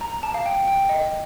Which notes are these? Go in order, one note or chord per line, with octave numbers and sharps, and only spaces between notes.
A#5
A5
F5
G5
G5
D#5